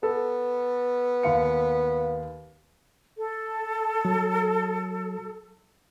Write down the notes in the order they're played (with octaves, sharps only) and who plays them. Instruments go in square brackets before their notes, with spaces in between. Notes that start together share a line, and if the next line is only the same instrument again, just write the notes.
[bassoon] B3 [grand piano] A4
[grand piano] D#2 F5 C#7
[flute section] A4
[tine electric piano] F#3